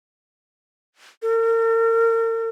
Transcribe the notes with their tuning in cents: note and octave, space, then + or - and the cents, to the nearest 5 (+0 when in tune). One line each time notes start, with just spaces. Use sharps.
A#4 -40